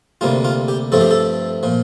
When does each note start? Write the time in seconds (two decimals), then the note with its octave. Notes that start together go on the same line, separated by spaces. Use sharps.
0.21 D2 C3 G3 A#3 F4
0.44 F4
0.68 G4
0.92 G2 F3 A3 C4 A4
1.01 G4
1.11 A4
1.63 A#2 F3